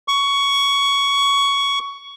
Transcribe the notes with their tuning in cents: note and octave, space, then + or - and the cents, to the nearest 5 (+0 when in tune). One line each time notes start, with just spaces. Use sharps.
C#6 +15